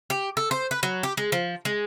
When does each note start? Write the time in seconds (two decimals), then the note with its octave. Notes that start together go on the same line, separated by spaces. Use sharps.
0.10 G4
0.37 A4
0.51 C5
0.71 B4
0.83 F#3
1.03 G4
1.17 G#3
1.32 F3
1.65 G#3